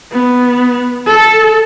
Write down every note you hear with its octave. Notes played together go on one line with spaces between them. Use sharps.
B3
A4